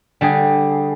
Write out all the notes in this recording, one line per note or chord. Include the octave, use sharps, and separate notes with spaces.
D3 G3 G#4